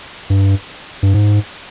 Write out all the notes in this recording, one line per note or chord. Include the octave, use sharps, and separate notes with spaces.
G2
G2
G#2